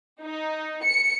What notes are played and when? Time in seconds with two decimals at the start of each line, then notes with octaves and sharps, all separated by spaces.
0.22 D#4
0.84 C#7